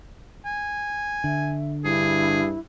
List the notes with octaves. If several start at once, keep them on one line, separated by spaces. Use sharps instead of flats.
G#5
D3 E5
G2 E4 G#4